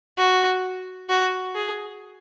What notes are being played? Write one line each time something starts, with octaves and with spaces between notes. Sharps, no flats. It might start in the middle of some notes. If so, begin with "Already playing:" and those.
F#4
F#4
G#4